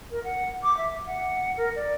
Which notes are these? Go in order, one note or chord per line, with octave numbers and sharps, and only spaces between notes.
A#4
F#5
D6
E5
F#5
A#4
D5